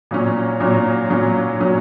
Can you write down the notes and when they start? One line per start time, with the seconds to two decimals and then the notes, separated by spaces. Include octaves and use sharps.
0.11 A#2 F#3 C#4
0.60 A#2 F#3 C#4
1.10 A#2 F#3 C#4
1.59 A#2 F#3 C#4